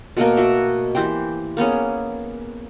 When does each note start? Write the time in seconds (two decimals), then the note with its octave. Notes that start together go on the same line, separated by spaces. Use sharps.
0.17 B2 A3 A#3 A#4
0.37 F#4 E5
0.95 E3 G4 C5 G5
1.57 A#3 B3 C#4 G#4